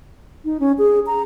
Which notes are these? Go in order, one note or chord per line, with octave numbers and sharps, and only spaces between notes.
D#4
C#4
G#4
A#5